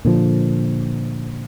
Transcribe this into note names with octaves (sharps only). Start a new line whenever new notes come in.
A#2 D3 F3